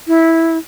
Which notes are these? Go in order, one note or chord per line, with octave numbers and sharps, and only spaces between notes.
E4